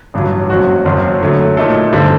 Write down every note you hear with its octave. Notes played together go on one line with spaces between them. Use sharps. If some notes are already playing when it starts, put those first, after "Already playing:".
A1 G2 F#3
F#1 F#2 F#3 C4 F#4
F#1 F#2 F#3 C4 F#4
D3 F#3 A3
A#2 A3 D#4 A4
G2 D3 G3 C4